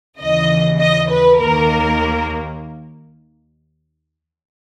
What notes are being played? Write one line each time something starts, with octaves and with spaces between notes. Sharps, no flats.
D#2 C#3 E3 D#5
D#5
B4
D#2 D#3 A#3 A#4